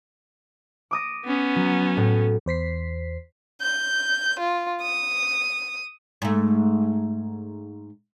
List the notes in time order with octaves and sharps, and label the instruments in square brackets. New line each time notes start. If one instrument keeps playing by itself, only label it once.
[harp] D6 D#6 A#6
[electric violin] B3 C#4
[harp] F#3
A2
[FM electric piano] E2 C5 B6 C7
[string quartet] G6
F4
D#6
[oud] G#2 A3